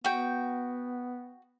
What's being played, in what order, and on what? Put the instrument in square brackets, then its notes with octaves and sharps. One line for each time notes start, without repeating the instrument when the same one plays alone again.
[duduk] B3 [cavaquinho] F#4 G5